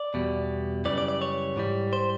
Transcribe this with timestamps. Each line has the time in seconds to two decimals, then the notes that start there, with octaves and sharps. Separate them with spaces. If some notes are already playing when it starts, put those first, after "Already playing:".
Already playing: D5
0.14 E2 B2 G3
0.85 F#2 C#3 E3 G3 D5
0.98 D5
1.08 D5
1.22 C#5
1.56 G#2 E3 G3
1.93 C5